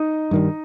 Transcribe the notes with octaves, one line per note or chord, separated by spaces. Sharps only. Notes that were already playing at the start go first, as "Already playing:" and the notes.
Already playing: D#4 D#5
G2 D#3 G3